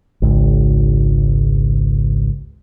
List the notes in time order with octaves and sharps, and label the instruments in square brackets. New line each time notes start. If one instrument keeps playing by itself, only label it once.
[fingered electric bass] G#1 C#2